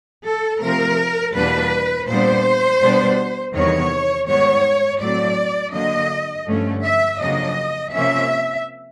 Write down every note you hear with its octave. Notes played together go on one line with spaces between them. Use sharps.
A4
C3 F3 A3 C4 A#4
E2 B2 G3 A#3 D4 B4
A#2 G3 B3 D4 C5
B2 G3 B3 D4
E2 C3 D#3 G3 B3 C#5
G#2 D#3 G3 B3 C#5
A2 F#3 A3 C4 D5
D3 F#3 A#3 D4 D#5
G2 D3 F3 A3 C#4
E5
F2 C#3 F#3 A#3 D4 D#5
C3 F3 A#3 C#4 E5